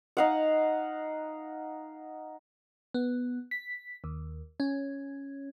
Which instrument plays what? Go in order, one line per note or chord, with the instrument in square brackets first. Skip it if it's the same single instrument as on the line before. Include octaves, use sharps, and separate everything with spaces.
[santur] D#4 F5 F#5
[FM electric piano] B3
B6
D#2
C#4